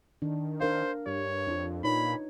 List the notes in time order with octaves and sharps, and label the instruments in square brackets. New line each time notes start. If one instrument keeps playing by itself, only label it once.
[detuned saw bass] D#3 [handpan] D4
[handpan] D4 A#4 F5 [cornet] C5
[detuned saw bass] G2 [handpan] G4 [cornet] C#5
[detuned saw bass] F2 [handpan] D4 F4
[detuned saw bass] A#2 [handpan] D#4 B4 C#5 [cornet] B5